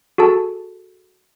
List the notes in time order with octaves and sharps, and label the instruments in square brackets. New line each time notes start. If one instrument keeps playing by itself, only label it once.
[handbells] F#4 G#4 A4 A5